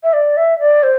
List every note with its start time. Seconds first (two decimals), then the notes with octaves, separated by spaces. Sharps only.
0.03 E5
0.13 D5
0.37 E5
0.59 D5
0.83 C5